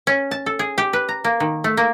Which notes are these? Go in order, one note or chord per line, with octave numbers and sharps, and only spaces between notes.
C#4
A5
A4
G#4
G4
B4
A#5
A#3
D#3
A3
A#3